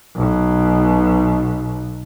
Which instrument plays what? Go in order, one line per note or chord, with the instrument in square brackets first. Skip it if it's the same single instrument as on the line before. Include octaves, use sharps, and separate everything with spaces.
[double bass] B1 B2